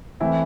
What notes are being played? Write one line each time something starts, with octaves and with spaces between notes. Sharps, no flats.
E3 A3 C4 E4